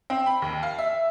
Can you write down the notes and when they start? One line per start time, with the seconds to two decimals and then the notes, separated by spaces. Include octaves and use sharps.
0.10 C4
0.26 B5
0.42 D#2
0.63 F5
0.79 E5